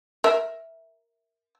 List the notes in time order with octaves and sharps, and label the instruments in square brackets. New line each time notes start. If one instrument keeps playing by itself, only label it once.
[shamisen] A#4 E5